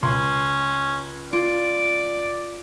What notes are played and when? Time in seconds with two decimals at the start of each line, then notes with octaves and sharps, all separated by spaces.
0.03 C#2 C#4 C6
1.33 F4 D5 D7